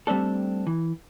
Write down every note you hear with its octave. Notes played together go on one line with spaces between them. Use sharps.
G3 A3 C4 D4 A4
E3